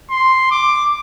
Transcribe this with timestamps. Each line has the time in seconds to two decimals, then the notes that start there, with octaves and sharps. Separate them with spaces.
0.11 C6
0.51 D6